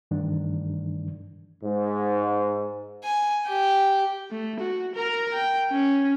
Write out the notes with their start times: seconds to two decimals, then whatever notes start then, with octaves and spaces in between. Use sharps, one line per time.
0.11 G2 D#3 E3 G3 A3 D4
1.64 G#2
3.04 G#5
3.46 G4
4.31 A3
4.60 F#4
4.95 A#4 A#5
5.34 G5
5.71 C#4